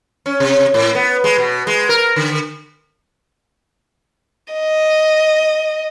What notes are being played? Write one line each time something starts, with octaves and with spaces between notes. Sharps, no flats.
C#4
C3
A2
B3
G#3
B2
G#3
A#4
D3
D#5